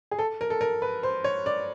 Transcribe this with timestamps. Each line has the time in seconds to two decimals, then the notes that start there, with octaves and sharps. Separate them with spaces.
0.11 G#4
0.19 A4
0.41 A#4
0.50 A4
0.61 A#4
0.82 B4
1.03 C5
1.24 C#5
1.46 D5